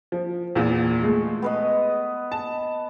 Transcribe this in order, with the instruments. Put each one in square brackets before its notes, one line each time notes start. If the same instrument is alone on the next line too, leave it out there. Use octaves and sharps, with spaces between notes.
[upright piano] F3
E2 A#2
G#3 A3
[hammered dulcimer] B3 B4 D#5
[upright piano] A5